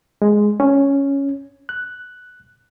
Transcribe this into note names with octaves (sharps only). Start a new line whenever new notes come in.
G#3
C#4
F#6